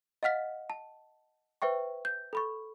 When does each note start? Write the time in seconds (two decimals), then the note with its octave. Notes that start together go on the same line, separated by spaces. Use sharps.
0.23 D#5 F5 F#5 F6 B6
0.70 A5
1.62 B4 C5 E5 G5 C#6
2.05 G6
2.33 A4 B5 C#6